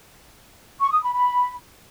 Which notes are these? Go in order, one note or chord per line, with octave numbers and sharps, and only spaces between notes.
C#6
D#6
B5
B5